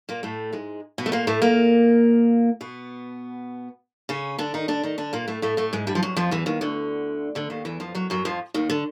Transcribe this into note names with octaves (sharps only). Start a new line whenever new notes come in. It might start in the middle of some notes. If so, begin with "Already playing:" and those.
A#2 A#3
A2 A3
G#2 G#3
B2 B3
A3
A#2 A#3
A2 A3
A#2 A#3
B2 B3
C#3 C#4
D3 D4
D#3 D#4
D3 D4
D#3 D#4
D3 D4
A#2 A#3
A2 A3
A2 A3
A2 A3
G#2 G#3
G2 G3
F3
F#2 F#3
F2 F3
E2 E3
D#2 D#3
D2 D3
D2 D3
D#2 D#3
E2 E3
F2 F3
F#2 F#3
F#2 F#3
F2 F3
D#2 D#3
D3